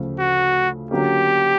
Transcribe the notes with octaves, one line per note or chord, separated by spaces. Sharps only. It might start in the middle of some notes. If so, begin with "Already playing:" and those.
Already playing: D2 C#3 F3 A3
F#4
D3 F#3 A#3 C#4 G4